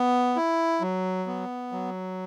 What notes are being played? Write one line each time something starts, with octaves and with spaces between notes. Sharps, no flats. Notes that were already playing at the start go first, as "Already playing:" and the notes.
Already playing: B3
E4
F#3
B3
F#3